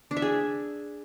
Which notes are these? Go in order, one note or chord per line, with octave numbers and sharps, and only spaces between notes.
D4
E5
G#4